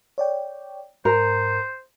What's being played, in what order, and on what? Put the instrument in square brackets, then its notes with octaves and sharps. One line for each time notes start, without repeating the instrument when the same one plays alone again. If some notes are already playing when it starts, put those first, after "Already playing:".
[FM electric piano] C#5 D5 G5
[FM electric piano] G#2 [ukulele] A#4 [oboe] C5